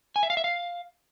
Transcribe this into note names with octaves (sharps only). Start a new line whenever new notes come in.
G#5
E5
F5
E5
F5